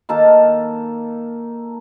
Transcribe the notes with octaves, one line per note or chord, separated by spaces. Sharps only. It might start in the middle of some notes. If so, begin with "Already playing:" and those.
D#3 A#3 A4 A5